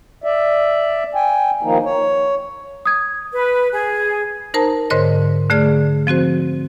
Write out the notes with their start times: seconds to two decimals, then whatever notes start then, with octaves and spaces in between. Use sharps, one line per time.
0.24 D5 E5
1.15 G5 G#5
1.63 D#3 F3 A#3 D#4
1.85 C#5
2.86 D#6 G#6
3.33 B4
3.73 G#4
4.54 D#4 A#4 C5 A5 A#5
4.90 G#2 D3 A#4 C5 C#5 D#5
5.50 D3 A3 G#4 D5 F6
6.07 F3 C4 F#4 C5